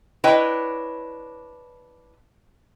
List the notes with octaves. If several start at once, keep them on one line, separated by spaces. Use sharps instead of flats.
D4 E4 B4 C#5 D#5 G5